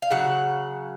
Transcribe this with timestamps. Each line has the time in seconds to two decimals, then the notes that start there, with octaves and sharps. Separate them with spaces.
0.02 F5
0.11 C#3 F#3 F#5